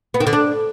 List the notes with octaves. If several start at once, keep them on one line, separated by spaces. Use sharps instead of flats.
B3
D#3
D3
D4